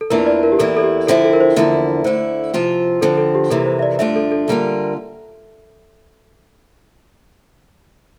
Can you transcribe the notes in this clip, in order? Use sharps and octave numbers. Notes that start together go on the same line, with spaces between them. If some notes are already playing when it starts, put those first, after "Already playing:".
A4
E2 E3 A#3 D4 F4 A#4
D5
A#4
G4
E2 E3 A#3 E4 A4
A4
G4
D3 F3 C4 E4 A4
A4
A#4
C5
E2 D3 F3 A#3 E4 E5
D3 A3 E4 C5
C3 F3 C4 F4
D3 F3 C4 A4
A4
G4
F2 C3 E3 A#3 A4
C5
E5
D5
G2 D3 A3 D4 F4 E5
A4
A4
D3 G3 A#3 F4